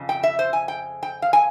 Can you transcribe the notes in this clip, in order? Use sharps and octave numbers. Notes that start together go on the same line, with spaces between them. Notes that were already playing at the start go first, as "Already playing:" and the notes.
Already playing: F2 C#3
G5
E5
C5
G#5
G5
G5
F5
G#5